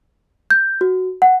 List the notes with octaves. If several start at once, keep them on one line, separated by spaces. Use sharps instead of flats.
G6
F#4
F#5